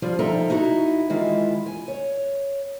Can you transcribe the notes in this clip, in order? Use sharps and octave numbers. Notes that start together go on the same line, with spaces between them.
F3 G3 F4 D5
F3 D#4 A4 E5 G5 A#5
D#4 E4 F#4
D#3 E3 G#3 E4 F4
G#5
C#5